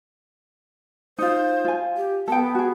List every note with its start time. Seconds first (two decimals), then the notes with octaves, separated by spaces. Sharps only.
1.18 D#4 F4 C5
1.65 F4 G#5
1.97 G4
2.28 B3 A4 G5
2.55 F#4 G#4